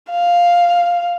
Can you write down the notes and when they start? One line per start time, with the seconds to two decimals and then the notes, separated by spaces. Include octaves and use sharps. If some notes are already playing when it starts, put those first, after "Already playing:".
0.11 F5